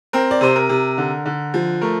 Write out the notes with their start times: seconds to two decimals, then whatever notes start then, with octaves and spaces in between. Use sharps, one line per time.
0.13 C4 A#4
0.31 D5
0.41 C3 C5
0.56 A#4
0.69 C3
0.98 D3
1.26 D3
1.54 F3
1.81 A3 A#4